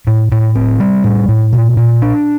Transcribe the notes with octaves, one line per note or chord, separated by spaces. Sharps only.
A2
A2
C4
G3
A2
A2
A#2
A#2
D4